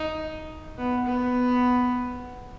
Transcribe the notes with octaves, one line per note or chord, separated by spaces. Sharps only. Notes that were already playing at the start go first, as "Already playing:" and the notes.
Already playing: D#4
B3
B3